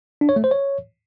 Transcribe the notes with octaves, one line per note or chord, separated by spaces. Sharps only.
D4
C#5
A3
C5
C#5